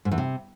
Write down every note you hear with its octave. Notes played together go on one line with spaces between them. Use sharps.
G#2
E2
C3